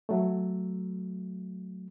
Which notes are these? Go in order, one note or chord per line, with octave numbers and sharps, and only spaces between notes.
F#3 A3